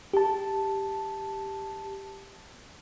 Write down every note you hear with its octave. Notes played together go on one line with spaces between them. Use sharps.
G4 A5